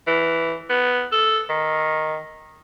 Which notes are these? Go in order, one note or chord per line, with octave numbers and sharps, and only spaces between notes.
E3
B3
A4
D#3